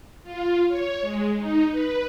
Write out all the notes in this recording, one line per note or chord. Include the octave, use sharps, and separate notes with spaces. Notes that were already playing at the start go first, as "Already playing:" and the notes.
F4
C#5
G#3
D#4
B4